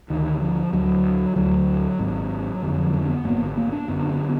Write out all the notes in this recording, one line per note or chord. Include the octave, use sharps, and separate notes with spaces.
D2 D3 D#3
F3
D2 D3 F#3
D2 D3 F#3
G#1 G#2
F#1 F2 D3
F3
F#3
D4
B3
G#1 G#2 A#3
D3
A#3
D4
F#1 F#2 D3 B3
B3